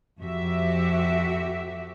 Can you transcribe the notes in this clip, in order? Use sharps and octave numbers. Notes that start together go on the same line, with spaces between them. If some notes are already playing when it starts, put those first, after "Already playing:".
F2 F#4 G4 E5